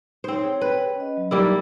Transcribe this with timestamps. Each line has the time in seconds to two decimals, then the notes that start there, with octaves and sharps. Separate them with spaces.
0.24 C4 D#4 C5 C#5
0.43 G#4 C#5 G5
0.61 B4
0.96 C#4 D#5
1.17 F#3
1.31 G3 A#3 D#4 E4 G4 A#4